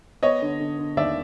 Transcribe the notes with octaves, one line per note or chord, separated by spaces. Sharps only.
B3 C#5 D#5
D3
D3
D3
D#2 D5 E5